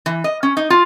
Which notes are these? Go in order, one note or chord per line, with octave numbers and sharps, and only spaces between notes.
E3
D#5
C#4
D#4
F4